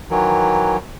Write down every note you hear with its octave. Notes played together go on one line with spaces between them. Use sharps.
D#3 E3 F#3